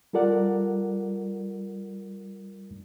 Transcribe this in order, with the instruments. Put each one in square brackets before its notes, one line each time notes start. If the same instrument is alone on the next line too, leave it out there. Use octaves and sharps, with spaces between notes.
[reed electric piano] G3 F4 A4 A#4 D5 F#5